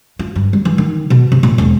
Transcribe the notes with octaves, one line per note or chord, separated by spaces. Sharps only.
F4
G2
G3
E3
D#3
B2
C3
A#2
E1